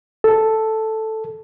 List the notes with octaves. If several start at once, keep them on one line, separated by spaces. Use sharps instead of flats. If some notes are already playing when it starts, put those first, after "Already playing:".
A4